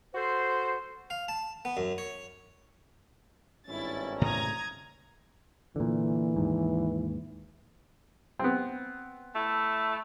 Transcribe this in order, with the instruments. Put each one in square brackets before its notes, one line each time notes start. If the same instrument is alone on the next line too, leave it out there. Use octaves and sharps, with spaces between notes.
[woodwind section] F#4 A4 C5
[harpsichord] F5
A5
B3
F#2
C#5
[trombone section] G#1 G2 C#4 [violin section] E4 A6
[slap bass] A2 C#3 E3 [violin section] A#5 D#6 G#6
[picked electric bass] A#2 D3 [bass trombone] E3
[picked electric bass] D#2 G#2
[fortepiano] B3 C4
[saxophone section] A3 E4